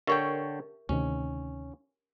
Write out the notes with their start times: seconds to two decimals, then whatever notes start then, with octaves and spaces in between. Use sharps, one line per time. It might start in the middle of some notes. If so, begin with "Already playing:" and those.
0.07 D3 G4 A#4 C#5 E5 G5
0.89 D2 C3 D#3 C#4